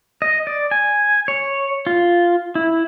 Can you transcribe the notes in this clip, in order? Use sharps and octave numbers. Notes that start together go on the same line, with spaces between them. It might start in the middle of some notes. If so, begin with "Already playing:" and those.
D#5
D5
G#5
C#5
F4
E4